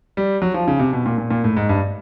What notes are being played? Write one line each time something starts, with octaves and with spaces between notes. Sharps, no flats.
G3
F#3
F3
C#3
C3
B2
A#2
A#2
A#2
A2
G#2
G2